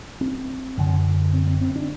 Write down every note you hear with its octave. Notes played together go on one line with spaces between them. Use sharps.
C4
F#2 D3
C4
C4
C4
D4